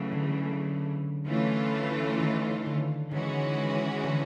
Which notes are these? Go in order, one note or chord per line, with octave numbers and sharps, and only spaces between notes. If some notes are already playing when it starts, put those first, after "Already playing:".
Already playing: C#3 E3 F#3 A3
D3
E3 A3 C#4 F4
D#3
D3
D#3 E3 G#3 C#4 F#4
D3